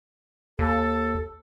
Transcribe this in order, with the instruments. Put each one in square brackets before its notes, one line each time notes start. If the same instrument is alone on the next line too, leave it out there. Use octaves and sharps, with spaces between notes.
[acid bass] D#2 [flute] A4